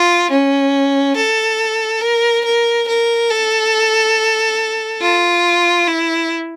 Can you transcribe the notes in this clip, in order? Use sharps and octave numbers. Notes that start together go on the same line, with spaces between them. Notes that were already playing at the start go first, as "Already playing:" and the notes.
Already playing: F4
C#4
A4
A#4
A#4
A#4
A4
F4
E4